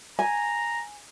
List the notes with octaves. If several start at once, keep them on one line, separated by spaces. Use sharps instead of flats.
G#5 A#5